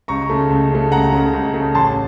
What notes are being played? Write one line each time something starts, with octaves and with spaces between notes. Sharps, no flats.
C#2 A#5 C#6
C#3 A3
C#2
C#3 A3
C#2 F#5 A#5
C#3 A3
C#2
C#3 A3
A1 A5 C6